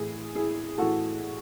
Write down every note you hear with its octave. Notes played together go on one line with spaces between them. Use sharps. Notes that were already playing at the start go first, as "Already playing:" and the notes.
Already playing: A2 E3 E4 G#4
E4 G#4
A2 E3 F#4 A4